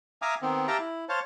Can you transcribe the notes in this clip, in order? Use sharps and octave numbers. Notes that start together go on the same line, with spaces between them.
E5 F5 G#5 A#5 D6 D#6
D#3 B3 C4
G4 E5 F5 G5 A5 A#5
E4
C5 C#5 F5 A5